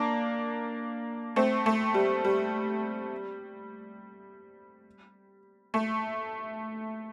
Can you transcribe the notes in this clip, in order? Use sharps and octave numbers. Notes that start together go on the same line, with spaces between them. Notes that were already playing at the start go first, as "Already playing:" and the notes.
Already playing: A#3 D4
A3 C4
A3
G3
G3
A3